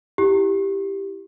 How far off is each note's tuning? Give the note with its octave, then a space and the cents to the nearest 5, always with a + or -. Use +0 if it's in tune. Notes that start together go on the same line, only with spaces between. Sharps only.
E4 +0 G4 +0